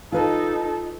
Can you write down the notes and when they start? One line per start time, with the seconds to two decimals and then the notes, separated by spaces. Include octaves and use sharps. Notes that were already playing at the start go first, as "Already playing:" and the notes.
0.12 D#4 F4 A4 B4 D#5